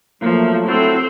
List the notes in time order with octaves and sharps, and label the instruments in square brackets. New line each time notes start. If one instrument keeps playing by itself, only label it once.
[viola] F3 [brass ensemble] F#3 A3 [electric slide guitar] A#3
[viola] C4 C5 [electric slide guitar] E4 F#4 A4